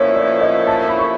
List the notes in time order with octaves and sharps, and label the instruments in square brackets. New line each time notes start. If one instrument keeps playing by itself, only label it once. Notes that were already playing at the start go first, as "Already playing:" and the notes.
Already playing: [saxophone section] A#2 F3 A3 C#4 E4 [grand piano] C5 C#5
[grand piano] D5
D#5
A5
B5
C#6